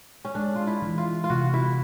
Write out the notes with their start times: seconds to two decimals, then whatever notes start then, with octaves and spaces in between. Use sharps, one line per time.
0.25 C#4
0.35 G#3 D4
0.56 F4
0.67 E4
0.82 E3
0.98 F4
1.24 F4
1.30 C3 F#4
1.54 E4